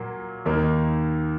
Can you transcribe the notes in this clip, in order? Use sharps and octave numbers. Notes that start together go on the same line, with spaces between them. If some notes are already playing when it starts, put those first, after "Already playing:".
Already playing: A#2 F#3 A#3
D#2 D#3 A#3 D#4